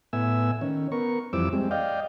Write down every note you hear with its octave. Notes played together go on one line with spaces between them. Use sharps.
A2 B3 E5 G#5 E6
D#3 C#4
B3 A#4 C#6
F2 E3 G3 C4 D6 E6
G3 G#3 C4
D5 D#5 F5 G5